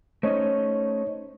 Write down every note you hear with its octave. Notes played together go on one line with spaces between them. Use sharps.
A3 C#4 D#4 C5 C#5 D#5